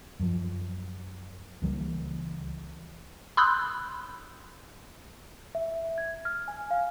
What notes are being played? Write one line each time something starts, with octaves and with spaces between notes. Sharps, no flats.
F#2 F3
C#2 E3 G3 A#3
B5 C6 D#6 E6 F#6 G6
E5
G#6
F6
G#5
F5